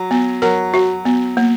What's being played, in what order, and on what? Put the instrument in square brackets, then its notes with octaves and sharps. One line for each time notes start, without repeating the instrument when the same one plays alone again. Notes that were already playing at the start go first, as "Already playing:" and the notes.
Already playing: [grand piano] F#3
[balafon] B3
[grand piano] F#3 [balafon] A#4
[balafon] F#4
B3
A#3